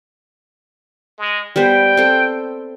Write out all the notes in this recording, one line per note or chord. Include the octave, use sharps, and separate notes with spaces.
G#3
G3 B3 C5 G5
C4 A4